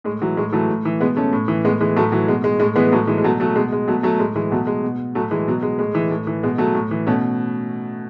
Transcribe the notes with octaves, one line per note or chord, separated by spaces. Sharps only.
A2 G#3
E3 F#3
A2 G#3
E3 F#3 A3
A2
E3
B2 G#3 B3
A3 C#4
A2
E3
A2 G#3 B3
E3 G#3
A2 F#3 A3
E3 F#3
B2 G#3
G#3
A2 G#3
E3 G#3 B3
A2 F#3 A3
E3 G#3
G#3
B2 F#3 A3
F#3 A3
B2 G#3
G#3
B2 F#3 A3
F#3 A3
A2 G#3
E3 G#3
B2 F#3 A3
G#3
B2
A2 F#3 A3
E3 G#3
B2 F#3
G#3
A2 G#3
E3
A2
E3
B2 G#3
F#3 A3
A2
E3
B2 A3 C#4